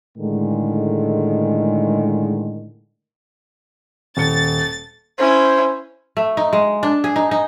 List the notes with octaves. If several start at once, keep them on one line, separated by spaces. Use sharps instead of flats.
A2 D3 D#3 G#3
D#1 A6 C#7
C#4 E4 C5
A3
D#4
G#3
D4
G#4
D#4
D#4